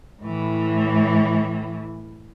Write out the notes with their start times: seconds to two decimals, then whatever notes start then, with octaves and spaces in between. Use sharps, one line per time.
0.22 A2 E3